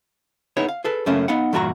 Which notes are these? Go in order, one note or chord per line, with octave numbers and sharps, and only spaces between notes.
B3 D#4 E4 G#4 C#5
F5
G#4 A4 B4
F#2 C#3 A3 A#3 C#4
B3 D#4 F5 F#5
E2 G2 A#2 F#4 A5 A#5